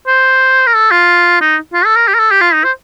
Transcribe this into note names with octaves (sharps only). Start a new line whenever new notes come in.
C5
A#4
A4
F4
D#4
F4
A4
A#4
G4
A#4
A4
G4
F4
D#4
C5